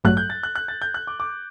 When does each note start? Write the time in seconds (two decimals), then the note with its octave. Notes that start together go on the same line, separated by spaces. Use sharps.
0.04 A1 G2 F#3 A3 F#6
0.17 G6
0.30 A6
0.43 F#6
0.55 F#6
0.68 A6
0.82 G6
0.94 F#6
1.07 D6
1.20 D6